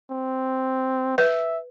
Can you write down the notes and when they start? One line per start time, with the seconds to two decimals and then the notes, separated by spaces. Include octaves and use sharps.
0.11 C4
1.18 B4 E5